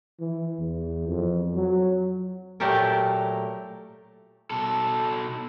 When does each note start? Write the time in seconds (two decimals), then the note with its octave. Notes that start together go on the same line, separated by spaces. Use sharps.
0.20 E3
0.59 E2
1.08 F2
1.55 F#3
2.60 A#2 F#3 A3 G4 A4 A#4
4.51 B2 A4